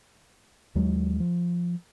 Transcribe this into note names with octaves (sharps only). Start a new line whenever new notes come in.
D#2 F#3 G#3
F3